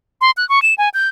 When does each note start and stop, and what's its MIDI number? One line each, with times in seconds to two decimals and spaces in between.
0.21 0.31 84
0.37 0.47 90
0.49 0.62 85
0.62 0.74 100
0.78 0.89 80
0.94 1.09 91